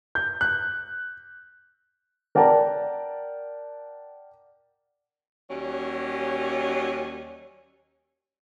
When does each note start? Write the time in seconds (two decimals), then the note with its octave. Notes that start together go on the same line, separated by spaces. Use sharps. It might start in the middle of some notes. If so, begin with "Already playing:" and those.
0.15 G6
0.41 F#6
2.35 A#4 D5 F#5 G5 A5 A#5
5.50 D#2 F#3 G3 C#4